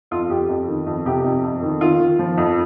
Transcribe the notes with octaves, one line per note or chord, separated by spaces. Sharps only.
F2 F4
F2 G4
F2
D#3
F2
C3 G4
F2
F2
D#3
D#3 F4
D#3
F3
F2